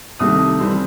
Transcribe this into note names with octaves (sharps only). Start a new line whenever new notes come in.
C2 C3 D#3 A3 D#6
E3 G3 C4